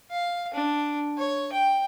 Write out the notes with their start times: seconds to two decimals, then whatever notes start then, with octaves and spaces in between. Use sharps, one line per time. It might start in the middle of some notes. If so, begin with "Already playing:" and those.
0.11 F5
0.54 D4
1.18 C#5
1.52 G5